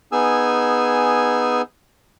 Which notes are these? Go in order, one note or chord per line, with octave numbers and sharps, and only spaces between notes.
B3 D#4 G#4 G#5 E6